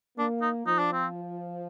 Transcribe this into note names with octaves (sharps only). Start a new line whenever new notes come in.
A#3 D4
D#4
F3 D#4
D4
C4